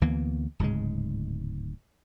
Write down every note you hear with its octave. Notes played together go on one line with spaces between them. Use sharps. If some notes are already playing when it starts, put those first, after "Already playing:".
D2 E3 A#3 B3
D1 G#2 C#3 G#3